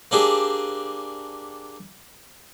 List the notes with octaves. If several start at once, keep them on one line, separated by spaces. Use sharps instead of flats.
A#3 C4 D4 G4 G#4